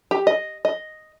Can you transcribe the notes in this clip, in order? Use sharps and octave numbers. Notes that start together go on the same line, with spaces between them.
G4
D#5
D#5